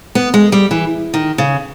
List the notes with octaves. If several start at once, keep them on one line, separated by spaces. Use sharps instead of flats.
B3
G#3
G3
E3
D#3
C#3